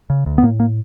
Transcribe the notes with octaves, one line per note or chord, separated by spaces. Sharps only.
C#3
D2
B3
A2 A#3
A#3